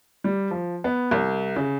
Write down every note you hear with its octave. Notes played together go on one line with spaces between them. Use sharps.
G3
F3
B3
C2
C#3